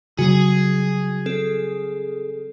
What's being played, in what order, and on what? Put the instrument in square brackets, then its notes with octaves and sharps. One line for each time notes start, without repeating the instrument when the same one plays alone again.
[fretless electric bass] C#3 F#3 G3 [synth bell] F#4 [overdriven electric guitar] G#4
[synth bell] C4 A4